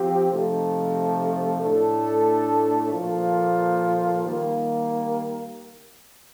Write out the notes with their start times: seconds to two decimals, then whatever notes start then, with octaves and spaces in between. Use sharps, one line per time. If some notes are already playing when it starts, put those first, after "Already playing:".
Already playing: F3 C4 G4
0.29 C3 F3 A3 D#4
1.61 A2 A3 D4 A4
2.92 A#2 F3 A#3 F4 A4
4.23 D#3 G3 A#3